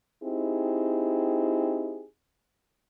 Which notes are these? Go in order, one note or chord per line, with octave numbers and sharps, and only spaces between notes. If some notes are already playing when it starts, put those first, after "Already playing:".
C4 D#4 E4 G4 G#4